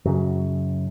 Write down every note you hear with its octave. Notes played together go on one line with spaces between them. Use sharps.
F#2 C#3 F#3